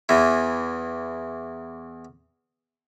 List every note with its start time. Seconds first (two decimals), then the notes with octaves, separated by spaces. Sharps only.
0.09 E2 E3